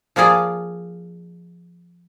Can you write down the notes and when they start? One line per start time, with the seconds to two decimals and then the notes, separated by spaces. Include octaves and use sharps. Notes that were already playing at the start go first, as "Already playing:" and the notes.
0.16 F3 A#3 F4 G#4 D5